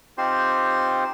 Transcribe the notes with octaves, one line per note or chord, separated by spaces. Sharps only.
C4 D#4 F4 G4 C5 C6